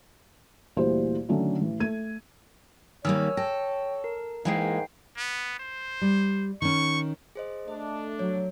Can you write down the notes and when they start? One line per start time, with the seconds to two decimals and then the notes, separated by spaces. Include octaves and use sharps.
0.77 D2 A#2 E3 G3 G4 C5
1.29 D3 D#3 F#3 A3 C#4 D4
1.61 A1
1.80 A3 G#6 D#7
3.05 D#3 G3 A#3 C#5 G#5 E6 F6
3.37 A4 G5 A#6
4.04 A#4
4.45 G#2 E3 G#3 A#3 F5 G5 C7
5.17 B3
5.60 C5
6.01 G3
6.62 D#3 C#4 C#6
7.35 G#4 C5 D#5
7.68 A3 D4 D#5
8.19 F#3 C#5